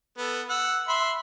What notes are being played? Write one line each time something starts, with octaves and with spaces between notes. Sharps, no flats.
B3 A4
F#5 E6
E5 B5 C6